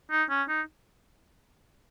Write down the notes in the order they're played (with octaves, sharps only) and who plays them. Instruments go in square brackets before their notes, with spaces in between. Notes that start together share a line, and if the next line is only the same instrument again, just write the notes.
[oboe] D#4
C#4
D#4